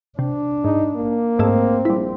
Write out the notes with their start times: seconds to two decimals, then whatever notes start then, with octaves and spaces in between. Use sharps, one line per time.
0.19 C3 D4
0.64 G#2 D#4
0.96 A#3
1.39 G#2 A3 C4
1.85 A#1 G3 E4